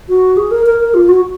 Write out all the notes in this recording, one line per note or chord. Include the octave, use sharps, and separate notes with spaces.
F#4
G#4
A#4
A#4
A#4
F4
F#4